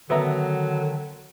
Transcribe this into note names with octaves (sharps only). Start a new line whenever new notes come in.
D3 D#3 F#3 B3 E5 A#5